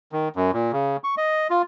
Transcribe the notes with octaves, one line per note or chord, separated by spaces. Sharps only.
D#3
F#2
A#2
C#3
C#6
D#5
F4